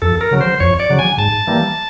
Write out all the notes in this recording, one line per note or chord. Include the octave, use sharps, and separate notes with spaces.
F2 A4
A#4
C#3 F#3
C5
F2 C#5
D5
C#3 F#3
G#5
G#2 A5
E3 G3 A#3